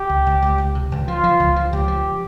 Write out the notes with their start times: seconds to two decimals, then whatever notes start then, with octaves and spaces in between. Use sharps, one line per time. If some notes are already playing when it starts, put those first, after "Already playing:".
Already playing: G4
0.10 C#2
0.27 C#2
0.42 C#2
0.58 C#2
0.75 C3
0.92 C#2
1.08 F3 F4
1.23 F3
1.40 C#2
1.56 F3
1.72 C#2 G4
1.88 F3